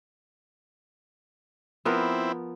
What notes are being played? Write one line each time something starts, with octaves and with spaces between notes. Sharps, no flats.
F3 B3 C4 E4 A#4